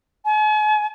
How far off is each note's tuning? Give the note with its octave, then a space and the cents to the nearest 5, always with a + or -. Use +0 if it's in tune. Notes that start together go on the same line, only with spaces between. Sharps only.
G#5 +45